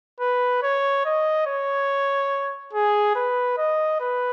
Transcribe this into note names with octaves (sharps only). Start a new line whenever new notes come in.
B4
C#5
D#5
C#5
G#4
B4
D#5
B4